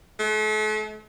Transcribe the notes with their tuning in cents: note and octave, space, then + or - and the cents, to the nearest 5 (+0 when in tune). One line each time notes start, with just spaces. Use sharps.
A3 -40